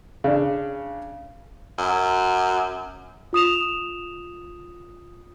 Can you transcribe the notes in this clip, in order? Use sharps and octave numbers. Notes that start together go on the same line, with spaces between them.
C#3 D4
F#2
F4 D#6 E7 F7